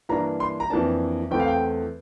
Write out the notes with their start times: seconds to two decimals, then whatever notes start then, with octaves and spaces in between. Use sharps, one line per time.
0.09 G2 E3 A#3 D4 A#5
0.40 C6
0.60 A#5
0.70 F2 E3 A#3 D4 A5
1.31 E2 E3 A3 C4 G5
1.40 F5
1.48 G5